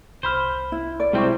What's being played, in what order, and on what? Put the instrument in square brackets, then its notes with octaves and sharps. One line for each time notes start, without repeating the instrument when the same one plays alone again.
[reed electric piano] C2 B5 F6 [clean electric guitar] C5
[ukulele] E4
D5
[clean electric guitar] C3 G3 C4 [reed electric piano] G#3 E4 C#6